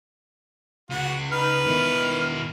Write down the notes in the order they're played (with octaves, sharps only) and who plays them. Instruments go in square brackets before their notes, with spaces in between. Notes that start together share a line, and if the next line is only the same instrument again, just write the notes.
[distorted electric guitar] C#2 [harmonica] F#4
[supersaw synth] D#4 [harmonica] B4 [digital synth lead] F6
[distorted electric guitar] B2 E4 [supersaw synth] D#3